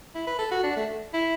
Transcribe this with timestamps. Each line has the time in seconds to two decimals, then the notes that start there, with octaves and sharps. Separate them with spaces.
0.15 E4
0.27 B4
0.39 A4
0.52 F#4
0.64 D4
0.76 A3
1.14 E4